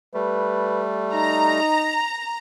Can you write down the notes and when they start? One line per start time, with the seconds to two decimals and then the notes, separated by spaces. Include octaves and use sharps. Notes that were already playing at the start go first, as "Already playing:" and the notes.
0.14 G3 A3 B4
1.14 D#4 A#5